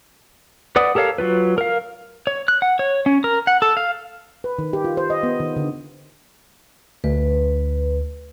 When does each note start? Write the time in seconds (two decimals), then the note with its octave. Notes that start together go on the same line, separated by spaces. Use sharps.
0.76 B4 D5 F#5 D#6
0.95 G4 A4 A#4 C#5 F5
1.18 F#3 F4 B4
1.58 A#4 F5
2.27 C#5
2.48 F#6
2.62 F#5
2.79 C#5
3.06 C#4
3.24 A#4
3.47 F#5
3.62 A4
3.77 F5
4.44 B4
4.59 D#3
4.73 G4
4.84 F4
4.97 C5
5.10 D#5
5.23 B3
5.40 D#3
5.56 D3
7.04 D2 B4